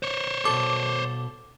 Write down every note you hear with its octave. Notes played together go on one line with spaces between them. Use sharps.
C5 C#5
B2 A4 D6